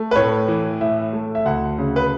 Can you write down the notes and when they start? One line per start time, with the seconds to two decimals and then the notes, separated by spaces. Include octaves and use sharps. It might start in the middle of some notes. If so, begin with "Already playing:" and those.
Already playing: A3
0.11 B4
0.16 A2 C#5
0.48 E3
0.81 A2 E5
1.13 A3
1.35 E5
1.46 D2 F#5
1.79 C#3
1.96 B4